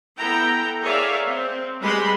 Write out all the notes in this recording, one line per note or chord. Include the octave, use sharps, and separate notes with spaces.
B3 E4 A4 G5 A#5
G#4 A#4 C#5 D5 E5 F5
C4
G3 G#3 B4 B5 C6